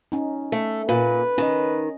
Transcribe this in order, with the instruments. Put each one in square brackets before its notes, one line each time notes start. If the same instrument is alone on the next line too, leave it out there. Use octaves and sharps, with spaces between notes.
[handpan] C#4 D#4
[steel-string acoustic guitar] A3
[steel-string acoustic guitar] A#2 [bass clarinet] B4
[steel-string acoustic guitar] D#3 [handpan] C#4 D#5